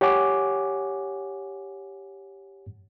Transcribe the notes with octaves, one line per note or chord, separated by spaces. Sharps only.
G4 C#5 F#5 G#5 D6